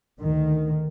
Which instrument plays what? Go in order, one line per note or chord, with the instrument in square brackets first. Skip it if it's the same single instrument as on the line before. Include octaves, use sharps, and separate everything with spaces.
[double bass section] D2 D#3